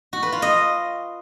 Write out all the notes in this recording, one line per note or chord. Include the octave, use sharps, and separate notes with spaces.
F#4
B4
F4
D#5